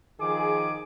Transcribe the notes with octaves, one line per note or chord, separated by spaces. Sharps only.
D#3 F3 G#4 D6